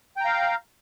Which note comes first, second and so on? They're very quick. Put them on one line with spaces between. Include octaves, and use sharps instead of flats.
G5 A#5 F5